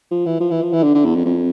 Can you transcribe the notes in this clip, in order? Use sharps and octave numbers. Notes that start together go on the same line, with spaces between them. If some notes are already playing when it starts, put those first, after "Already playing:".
F3
E3
F3
E3
F3
E3
D3
D3
E2
F2
F2